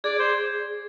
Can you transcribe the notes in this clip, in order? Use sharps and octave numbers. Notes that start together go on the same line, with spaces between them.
G#4 D5
C5